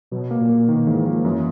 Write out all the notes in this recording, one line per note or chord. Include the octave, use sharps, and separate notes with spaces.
B2 F#3
A#3
A#2
A#3
B2 D#3
G#2 E3
F3 A#3
F#2 E3